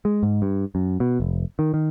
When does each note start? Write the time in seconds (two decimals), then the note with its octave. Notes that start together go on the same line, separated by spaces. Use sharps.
0.05 G#3
0.23 G#2
0.42 G2
0.75 F#2
1.00 B2
1.20 F1
1.59 D#3
1.74 D#3